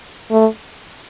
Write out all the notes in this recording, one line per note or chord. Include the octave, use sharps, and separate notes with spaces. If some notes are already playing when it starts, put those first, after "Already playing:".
A3